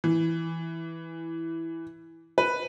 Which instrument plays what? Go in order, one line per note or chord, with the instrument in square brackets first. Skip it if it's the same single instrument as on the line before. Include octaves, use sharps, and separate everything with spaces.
[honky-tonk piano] E3
B4